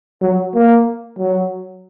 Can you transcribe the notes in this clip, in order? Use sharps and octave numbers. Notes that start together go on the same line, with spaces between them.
F#3
A#3
F#3